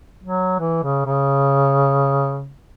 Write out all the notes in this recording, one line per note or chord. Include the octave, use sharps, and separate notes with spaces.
F#3
E3
C#3
C#3